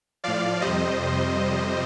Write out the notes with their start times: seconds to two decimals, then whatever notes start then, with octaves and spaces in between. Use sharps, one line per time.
0.24 A2 F3 D5 F5
0.61 F2 C3 G3 C5 D#5